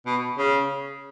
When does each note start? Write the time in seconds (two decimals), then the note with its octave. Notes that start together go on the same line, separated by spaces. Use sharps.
0.06 B2
0.38 C#3